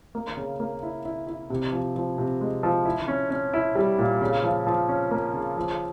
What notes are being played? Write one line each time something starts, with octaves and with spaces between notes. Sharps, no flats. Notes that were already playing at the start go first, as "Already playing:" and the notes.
A#3
C#3
A#3
E4
E4
E4
C3
F3
F3
C3
G#3
F3
E4
C#4
C#4
E4
G3
A#2
C#3
F3
F3
C#4
A#3
C#3
F3